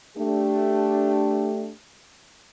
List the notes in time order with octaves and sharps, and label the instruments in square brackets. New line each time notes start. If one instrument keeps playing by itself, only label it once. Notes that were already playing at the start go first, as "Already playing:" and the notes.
[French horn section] A3 D4 G4